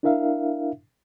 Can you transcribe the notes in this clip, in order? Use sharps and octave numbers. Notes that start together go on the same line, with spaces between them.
D4 E4 A#4 E5 F5